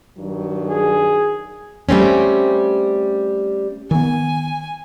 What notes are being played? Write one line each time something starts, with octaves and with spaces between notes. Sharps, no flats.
G2 D#3 F#3
G#4
G3 A3 C4 C#4
D#3 B3 G#5